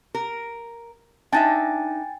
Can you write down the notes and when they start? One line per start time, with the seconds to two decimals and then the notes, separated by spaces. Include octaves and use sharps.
0.15 A#4
1.32 D4 D#4 E5 G5 G#5 A6